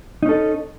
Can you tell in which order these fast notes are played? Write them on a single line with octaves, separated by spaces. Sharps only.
D#4 C#4 A4